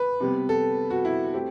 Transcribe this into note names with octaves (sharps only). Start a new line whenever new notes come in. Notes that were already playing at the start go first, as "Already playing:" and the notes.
Already playing: B4
C3 G3 B3
A4
F#4
E4
A3 C4 G4